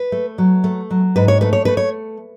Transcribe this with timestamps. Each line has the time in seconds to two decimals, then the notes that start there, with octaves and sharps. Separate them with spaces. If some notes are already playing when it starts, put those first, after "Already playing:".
Already playing: B4
0.12 A3
0.38 F#3
0.64 A3
0.91 F#3
1.16 G#2 B4
1.28 C#5
1.41 A3 B4
1.53 C#5
1.65 A3 B4
1.77 C#5